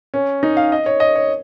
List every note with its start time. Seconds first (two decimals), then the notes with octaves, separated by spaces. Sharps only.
0.14 C#4
0.43 D#4
0.57 F5
0.72 D#5
0.86 C#5
1.00 D#5
1.15 C#5